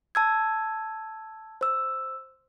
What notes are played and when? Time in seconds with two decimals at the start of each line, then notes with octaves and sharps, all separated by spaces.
0.15 A5 E6 G#6
1.61 C5 E6